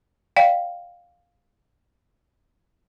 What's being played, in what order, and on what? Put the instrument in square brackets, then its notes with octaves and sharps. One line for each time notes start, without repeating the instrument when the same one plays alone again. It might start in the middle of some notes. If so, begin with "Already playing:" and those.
[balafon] D5 F5 G5